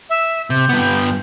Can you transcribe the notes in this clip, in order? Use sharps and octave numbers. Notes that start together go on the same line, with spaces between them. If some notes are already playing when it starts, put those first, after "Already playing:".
E5
C3 G6
G2 B3